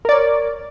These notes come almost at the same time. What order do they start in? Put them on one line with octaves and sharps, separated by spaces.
A#4 D5 C#5